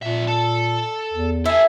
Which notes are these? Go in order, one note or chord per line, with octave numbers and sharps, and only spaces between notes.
F2 A#2 E5
A4 A5
E2
E4 A4 G#5